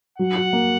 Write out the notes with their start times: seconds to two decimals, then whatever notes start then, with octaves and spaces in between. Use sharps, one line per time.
0.18 F#3 F#5
0.36 F#4
0.53 A#3